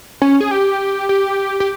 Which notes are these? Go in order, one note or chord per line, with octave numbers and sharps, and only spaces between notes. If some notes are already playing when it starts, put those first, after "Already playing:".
C#4
G#4
G4
G4
G4